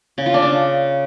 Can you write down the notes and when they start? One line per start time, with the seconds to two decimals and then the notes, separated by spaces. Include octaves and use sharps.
0.18 C#3
0.26 F4
0.34 D4
0.42 C#3